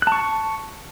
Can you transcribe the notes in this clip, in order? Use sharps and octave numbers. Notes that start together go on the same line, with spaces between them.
A5 C#6 F#6